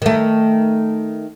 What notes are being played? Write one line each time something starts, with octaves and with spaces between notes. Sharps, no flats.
D#3 A3